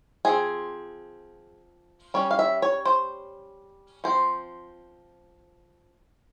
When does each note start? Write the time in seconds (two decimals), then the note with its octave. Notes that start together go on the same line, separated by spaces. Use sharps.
0.25 F3 C4 G#4
2.14 G3 C#4 C#5
2.31 F5
2.39 E5
2.62 C#5
2.85 C5
4.04 F3 C4 C5